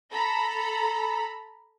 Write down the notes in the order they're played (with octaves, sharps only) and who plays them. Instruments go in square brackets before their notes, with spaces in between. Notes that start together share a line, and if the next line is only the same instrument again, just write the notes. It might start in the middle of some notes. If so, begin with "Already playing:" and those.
[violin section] A4 A#5 B5